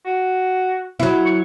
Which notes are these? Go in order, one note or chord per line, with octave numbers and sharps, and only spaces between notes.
F#4
F#3 E4
C#6